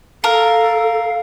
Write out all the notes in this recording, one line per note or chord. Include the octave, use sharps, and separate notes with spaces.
A4 A#4 F5